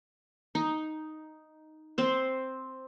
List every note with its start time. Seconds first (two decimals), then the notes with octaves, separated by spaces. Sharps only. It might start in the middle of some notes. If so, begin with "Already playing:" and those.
0.55 D#4
1.98 C4 C5